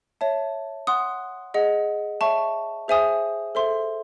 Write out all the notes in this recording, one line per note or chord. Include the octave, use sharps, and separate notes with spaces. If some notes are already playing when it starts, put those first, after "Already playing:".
C#5 E5 A5
F#5 C6 D#6 F#6
G#4 D#5 F#5
C#5 E5 A5 C#6
G#4 C5 E5 G#5 D#6
A4 C5 E5 C6